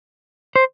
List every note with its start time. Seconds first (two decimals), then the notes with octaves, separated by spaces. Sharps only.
0.56 C5